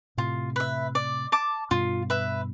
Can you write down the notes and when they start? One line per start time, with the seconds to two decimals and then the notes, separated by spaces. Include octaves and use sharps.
0.17 A2 C3 F4
0.56 B4 E5
0.95 D5
1.32 A5 D6
1.71 G2 B2 F4
2.10 B4 E5